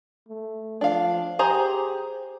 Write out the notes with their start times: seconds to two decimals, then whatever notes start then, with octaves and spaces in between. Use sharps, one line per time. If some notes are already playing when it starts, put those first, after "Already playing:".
0.29 A3
0.81 F3 D4 F5
1.39 G4 G#4 C5 A#5